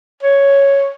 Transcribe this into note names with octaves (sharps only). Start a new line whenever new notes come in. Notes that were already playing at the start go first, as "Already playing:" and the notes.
C#5